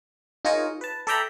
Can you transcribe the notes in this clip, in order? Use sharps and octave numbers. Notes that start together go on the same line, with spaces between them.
D#4 F4 G#4 A#4 C#5 D#5
B4 A5
A4 D5 E5 G5 A#5 B5